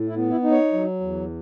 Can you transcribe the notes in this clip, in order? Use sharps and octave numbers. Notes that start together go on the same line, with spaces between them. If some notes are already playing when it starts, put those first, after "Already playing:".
Already playing: A2
E4
B3
E4
D#4
C#5
F#3
E2